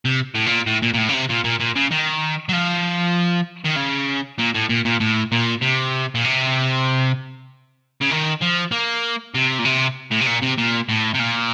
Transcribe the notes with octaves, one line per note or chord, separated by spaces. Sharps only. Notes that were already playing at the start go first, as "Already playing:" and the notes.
C3
A2
A#2
A2
A#2
A#2
A2
C#3
C3
A#2
A#2
A#2
C#3
D#3
F#3
F3
D#3
C#3
A#2
A2
A#2
A#2
A2
A#2
C3
A#2
C3
C#3
D#3
F3
A#3
C3
A#2
C3
A2
C3
A#2
C3
A#2
A2
C3
A#2